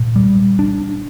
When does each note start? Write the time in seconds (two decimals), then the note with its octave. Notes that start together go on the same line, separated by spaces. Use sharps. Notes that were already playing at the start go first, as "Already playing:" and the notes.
Already playing: A#2
0.16 G3
0.59 D4